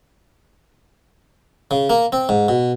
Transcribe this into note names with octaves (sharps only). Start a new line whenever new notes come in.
C#3
A#3
C4
G#2
B2